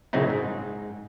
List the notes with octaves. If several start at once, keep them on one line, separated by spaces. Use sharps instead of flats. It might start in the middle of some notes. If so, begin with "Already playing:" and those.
A#2 C#3 F#3 C4 D#4 E4
G#2